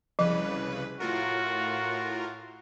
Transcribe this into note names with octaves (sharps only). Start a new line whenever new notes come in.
C2 C#3 F3 B4
A2 F4 F#4 A#4